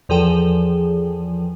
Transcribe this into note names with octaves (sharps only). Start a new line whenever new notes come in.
E2 F3 G#4 A4 G5